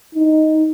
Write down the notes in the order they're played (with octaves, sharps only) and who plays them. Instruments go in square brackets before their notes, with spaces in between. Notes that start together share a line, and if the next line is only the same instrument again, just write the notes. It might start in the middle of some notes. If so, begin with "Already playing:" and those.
[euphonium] D#4